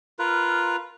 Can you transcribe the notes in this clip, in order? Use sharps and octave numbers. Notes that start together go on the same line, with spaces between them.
F4 A#4 B4